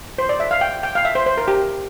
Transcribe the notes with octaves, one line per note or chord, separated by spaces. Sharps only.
C5
D5
E5
F5
G5
G5
F5
E5
C5
C5
A#4
G4